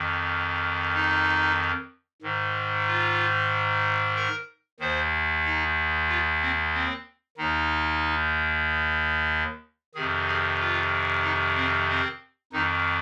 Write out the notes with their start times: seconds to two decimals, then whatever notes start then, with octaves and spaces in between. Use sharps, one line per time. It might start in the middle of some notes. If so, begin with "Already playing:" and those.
Already playing: F2 D#3
0.94 D#4
2.22 G#2 D#3
2.87 F4
4.16 A#4
4.80 D#2 D#3 C5
5.45 D#4
6.08 F4
6.42 C4
6.74 C4
7.37 D#2 D#3 D#4
9.94 F2 C3 D#3 G#4
10.27 G#4
10.60 F4
11.23 D#4
11.56 C4
11.89 C4
12.52 F2 D#3 D#4